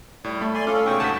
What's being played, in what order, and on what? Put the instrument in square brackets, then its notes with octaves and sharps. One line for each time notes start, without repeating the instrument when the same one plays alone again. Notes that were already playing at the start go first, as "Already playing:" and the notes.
[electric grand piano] A2 [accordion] G3
[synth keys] A3 [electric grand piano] B5
[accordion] D5 G#5 C6
[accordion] C#4 F4 A4 [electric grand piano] D6 F6
[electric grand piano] G#2 B2 [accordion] G5 C#6 D#6
[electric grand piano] D2 G2 B6 [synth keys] F#5 A5